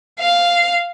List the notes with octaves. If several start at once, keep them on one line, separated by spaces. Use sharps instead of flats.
F5